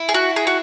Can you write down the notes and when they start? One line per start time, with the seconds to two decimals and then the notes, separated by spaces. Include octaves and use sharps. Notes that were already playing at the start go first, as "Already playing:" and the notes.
Already playing: E4
0.09 G#4
0.14 F#4
0.36 G#4
0.47 F#4